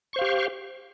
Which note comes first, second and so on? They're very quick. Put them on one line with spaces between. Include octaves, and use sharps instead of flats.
C#6 C5 F5 G4